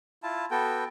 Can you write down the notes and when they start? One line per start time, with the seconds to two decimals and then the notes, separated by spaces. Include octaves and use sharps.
0.23 E4 F4 A5
0.51 B3 F#4 A4 G5